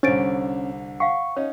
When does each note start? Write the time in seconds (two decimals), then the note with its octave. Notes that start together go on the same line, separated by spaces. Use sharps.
0.03 C2 D3 C#4 C5 A6 D7
1.00 F5 F#5 C#6
1.37 C#4 D#4 C#5